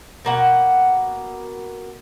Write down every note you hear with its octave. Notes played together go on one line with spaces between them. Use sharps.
B2 A#3 F#5